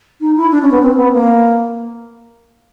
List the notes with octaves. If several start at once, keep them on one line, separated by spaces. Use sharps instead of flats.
D#4
E4
D4
C#4
B3
C4
B3
A#3